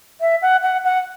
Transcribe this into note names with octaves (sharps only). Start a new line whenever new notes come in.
E5
F#5
F#5
F#5